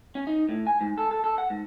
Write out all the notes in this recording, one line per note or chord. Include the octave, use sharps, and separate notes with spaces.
C#4
D#4
A2
G#5
G#2
A4
A4
A4
F#5
G#2